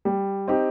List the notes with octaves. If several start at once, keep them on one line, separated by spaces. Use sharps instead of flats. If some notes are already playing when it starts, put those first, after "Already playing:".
G3
C4 D#4 G4